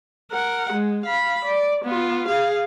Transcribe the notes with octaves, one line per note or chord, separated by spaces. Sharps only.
A#4 F#5
G#3
F5 B5
D5
B3 F4
G#4 F5